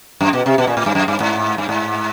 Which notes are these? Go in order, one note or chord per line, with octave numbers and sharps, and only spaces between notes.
F#2
B2
C3
B2
A#2
A2
G2
F#2
G2
G#2
G2
G#2